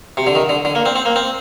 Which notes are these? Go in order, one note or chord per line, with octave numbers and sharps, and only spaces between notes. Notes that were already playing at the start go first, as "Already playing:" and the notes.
C3
D3
D#3
D3
D3
A#3
C4
C4
A#3
C4